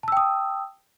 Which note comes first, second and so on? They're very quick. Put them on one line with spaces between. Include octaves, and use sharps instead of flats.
A5 E6 G5 D#6